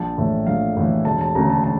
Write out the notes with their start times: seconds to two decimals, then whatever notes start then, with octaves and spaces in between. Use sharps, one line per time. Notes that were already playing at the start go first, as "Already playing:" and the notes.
Already playing: A#1 A5
0.18 A2 E3
0.47 A#1 F5
0.77 A2 E3
1.05 E1 A5
1.21 A5
1.35 D2 C#3 A#5
1.50 A5
1.64 A5